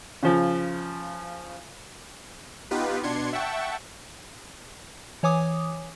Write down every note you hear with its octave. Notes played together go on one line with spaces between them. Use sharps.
C#3 F3
B3 D#4 F4 G4 B4
B2 D4 C6 G#6 C#7
E5 F#5 G5 A5 C#6
E3 C#5 G#5 D6 D#6